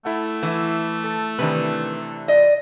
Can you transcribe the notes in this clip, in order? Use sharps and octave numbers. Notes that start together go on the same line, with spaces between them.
A3 E4 A4 F#5
E3
A4 A5
C3 D#3 E3 D4 B4
D5 D#5